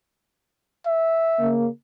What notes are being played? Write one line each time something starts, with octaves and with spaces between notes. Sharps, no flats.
E5
C#3 A#3